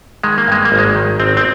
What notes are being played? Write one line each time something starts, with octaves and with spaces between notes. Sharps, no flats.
D#3 G#3
A#3
G2 G#3
A#3
G#1
G#3
D#3
G#1 C4
C4